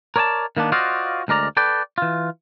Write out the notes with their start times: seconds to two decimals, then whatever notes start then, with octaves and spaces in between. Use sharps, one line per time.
0.16 A#4 C#5 D5 G#5 A5
0.57 D#3 A#3 B3 D4
0.72 F4 F#4 C5 D5 D#5 F5
1.28 D2 G#3 A#4 D5 A#5
1.57 A4 B4 D5 G5
1.98 E3 F4